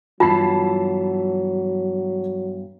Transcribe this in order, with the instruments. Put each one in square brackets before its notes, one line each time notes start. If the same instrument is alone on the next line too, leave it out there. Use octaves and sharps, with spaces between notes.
[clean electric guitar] G2 E3 B3 [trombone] F#3 [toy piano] F4 [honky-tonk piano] A5 B5 C7